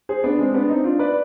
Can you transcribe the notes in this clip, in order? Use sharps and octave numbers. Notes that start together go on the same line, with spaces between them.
G#4 C5
B3 D4
G#3 C4
B3 D4
C4 D#4
D4 F4
B4 D5